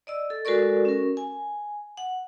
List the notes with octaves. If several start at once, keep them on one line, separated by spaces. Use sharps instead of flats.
D5 D#5 E6
A4
G#3 F#4 A4 A#4 D5 C#6
C#4 A#4
G#5
F#5